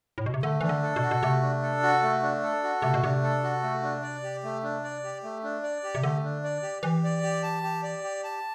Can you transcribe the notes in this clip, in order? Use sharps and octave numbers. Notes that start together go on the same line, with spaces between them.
A2
B2
C3
D3 A3
E3 D4
D3
A4
B2
F#4
B2
C3 A3
D4
A4
F#4
A3
D4
A4
F#4
C3 A3
B2
C3 D4
A4
F#4
A3
D4
D5
G4
A3
D4
D5
G4
A3
D4
D5
G4
C3
D3 A3
D4
D5
G4
E3 G4
D5
G4
A5
G4
D5
G4
A5